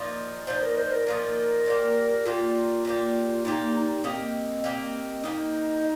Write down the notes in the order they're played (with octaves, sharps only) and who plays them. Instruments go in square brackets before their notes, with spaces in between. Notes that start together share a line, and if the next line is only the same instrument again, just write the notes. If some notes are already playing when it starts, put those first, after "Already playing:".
Already playing: [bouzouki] A#2 F3 D#4
[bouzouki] A#2 F3 D#4 [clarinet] C5
[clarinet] A#4
C5
A#4
[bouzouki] A#2 F3 D#4 [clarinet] A#4
[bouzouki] A#2 A#3 G4
[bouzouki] A#2 A#3 G4 [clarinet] F4
[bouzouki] A#2 A#3 G4
[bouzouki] A#2 A#3 G4 [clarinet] D#4
[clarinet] D#4
[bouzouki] A#3 G4 D#5 [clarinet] C4
[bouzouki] A#3 G4 D#5
[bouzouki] A#3 G4 D#5 [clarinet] D#4